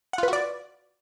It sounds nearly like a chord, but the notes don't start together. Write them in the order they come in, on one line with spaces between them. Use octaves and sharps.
F#5 F4 B4 F#4 D5